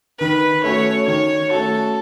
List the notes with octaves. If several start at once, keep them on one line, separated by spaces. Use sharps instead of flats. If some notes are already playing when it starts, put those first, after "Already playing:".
D#3 B4
A3 C#4 F#4 C#5
D#3 C#5
A3 C#4 F#4 A4